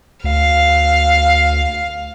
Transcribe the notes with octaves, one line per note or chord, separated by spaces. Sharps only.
D2 F5